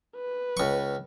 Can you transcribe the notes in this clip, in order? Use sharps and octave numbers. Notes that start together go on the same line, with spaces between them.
B4
C#2 C#6